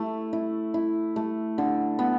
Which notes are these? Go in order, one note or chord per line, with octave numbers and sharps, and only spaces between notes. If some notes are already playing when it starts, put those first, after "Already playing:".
Already playing: A3 E4
E4
E4
A3
D3
B3